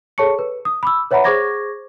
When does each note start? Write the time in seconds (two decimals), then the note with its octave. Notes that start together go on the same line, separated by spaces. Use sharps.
0.18 G#4 A4 C#5 A5 C#6 C#7
0.39 B4
0.65 D#6
0.83 B5 D6 E6
1.11 B4 C#5 E5 F#5 A#5 B5
1.24 G#4 C5 C#6 D6 G#6 A#6